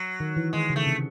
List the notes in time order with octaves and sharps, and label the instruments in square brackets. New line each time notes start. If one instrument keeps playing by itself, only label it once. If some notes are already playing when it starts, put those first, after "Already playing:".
Already playing: [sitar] F#3
[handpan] D#3
E3
[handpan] D#3 [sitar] G#3
[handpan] C#3
[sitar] A3
[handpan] C3